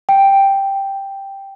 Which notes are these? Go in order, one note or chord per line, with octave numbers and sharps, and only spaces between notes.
G5